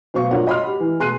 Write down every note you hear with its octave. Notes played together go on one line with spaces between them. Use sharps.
B2 F#3 C5 F5 C#6
F#3 D4 F4 A#4 C#5 F#5
F#4 D#5 B5 C6 F6
G4
E3
B2 G#4 C6 F#6 C7 D#7